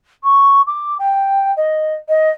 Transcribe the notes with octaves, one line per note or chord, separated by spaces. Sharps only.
C#6
D6
G5
D#5
D#5